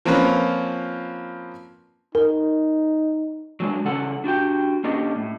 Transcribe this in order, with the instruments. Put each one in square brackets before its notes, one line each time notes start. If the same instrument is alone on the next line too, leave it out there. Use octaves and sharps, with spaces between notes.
[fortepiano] F3 A#3 C4 C#4 F4 B4
[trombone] D#4 [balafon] A#4
[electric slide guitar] F#3 G#3 D4
C#3 G3 C#4 A4 F#5
D4 F#4 G4 G5
A#3 C#4 D4 G4 D#5
A2